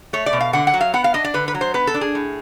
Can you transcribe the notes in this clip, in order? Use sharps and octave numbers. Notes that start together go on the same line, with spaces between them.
A3 C#5
D5
B2
F5
D3 F#5
F#5
F#3
F5
B3 F#5
F5
D4 D#5
D5
D3 B4
B4
F#3
C5
B3 B4
A4
D4
G#4
A2